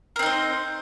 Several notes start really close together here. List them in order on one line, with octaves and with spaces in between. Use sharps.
A#4 C4 D#4 C5